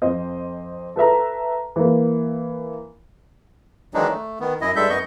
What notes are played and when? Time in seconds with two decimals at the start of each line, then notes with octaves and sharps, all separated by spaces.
0.02 F2 C5 D#5
0.96 A4 B4 E5 A#5
1.76 E3 A#3
3.94 D#3 E3 F#3 G#3 D4 D#4
4.10 A3
4.40 D#3 B3
4.61 F#2 E4 D#5
4.76 G2 G3 G#3 A4 E5 G6
4.90 F#2 B3 D#5 C#6 G6